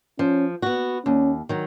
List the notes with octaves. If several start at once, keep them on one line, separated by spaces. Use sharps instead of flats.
F3 C#4
B3 F#4
D#2 C#4
D#3 F#3